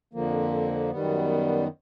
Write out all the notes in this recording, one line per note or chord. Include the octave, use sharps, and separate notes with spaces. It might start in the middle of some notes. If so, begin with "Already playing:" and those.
F2 D3 F3 A#3
F#2 D#3 G3 B3